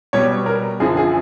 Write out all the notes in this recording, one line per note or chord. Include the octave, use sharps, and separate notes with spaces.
B2 G3 C#5
A#4
F#2 D3 F3 G#4
G#4